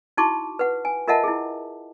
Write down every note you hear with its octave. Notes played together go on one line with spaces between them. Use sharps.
D#4 E4 F#4 A5 C#6 D6
B4 F#5
G#5
F4 A#4 D#5 E5 F#5 A5
E4 G#4